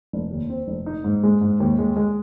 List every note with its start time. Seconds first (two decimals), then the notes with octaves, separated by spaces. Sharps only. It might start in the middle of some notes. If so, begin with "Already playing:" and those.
0.13 F1
0.31 D#2
0.50 C4
0.68 F1
0.86 D#4
1.04 G#2
1.23 G#3
1.41 G#2
1.60 D#2
1.78 G#3
1.96 G#3